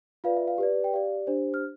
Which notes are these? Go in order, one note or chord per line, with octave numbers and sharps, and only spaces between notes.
F4 B4 D5 F5
E5
F5
G4 B4 D5
G5
G4 D5 F5
D4 G4 C5
F6